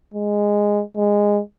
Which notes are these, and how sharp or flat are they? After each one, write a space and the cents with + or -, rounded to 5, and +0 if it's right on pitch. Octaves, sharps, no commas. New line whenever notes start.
G#3 -10
G#3 -15